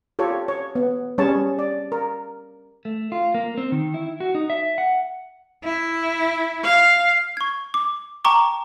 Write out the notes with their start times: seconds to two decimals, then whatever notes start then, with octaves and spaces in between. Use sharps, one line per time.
0.19 F4 G4 A4 C#5
0.48 C#5
0.75 B3
1.18 G3 C#4 G#4 C#5 A5
1.59 D5
1.92 A#4
2.85 A3
3.12 F4
3.34 A#3
3.58 C4
3.72 D#3
3.94 E4
4.20 F#4
4.35 D#4
4.50 E5
4.78 F#5
5.64 E4
6.63 F5
7.37 C#6 G#6
7.74 D6
8.25 G5 A5 A#5 C#6 D6